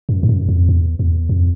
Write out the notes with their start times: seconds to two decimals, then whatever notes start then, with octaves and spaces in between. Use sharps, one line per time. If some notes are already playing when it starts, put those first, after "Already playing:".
0.09 F#2
0.23 G2
0.29 F#2
0.49 F2
0.69 E2
0.99 E2
1.29 F2